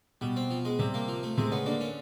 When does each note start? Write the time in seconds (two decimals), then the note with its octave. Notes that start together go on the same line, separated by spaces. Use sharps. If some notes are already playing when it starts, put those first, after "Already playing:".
0.21 B2 G3 B3
0.36 C4
0.50 F3
0.65 G#3 B3
0.79 C3 G3 C4
0.94 A#3
1.08 F3
1.23 A3
1.38 C3 G#3 C4
1.51 C#3 B3 C#4
1.66 D3 A#3 D4
1.81 C#4